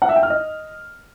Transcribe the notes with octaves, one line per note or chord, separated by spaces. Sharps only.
F#5
E5
G5
F6
D#5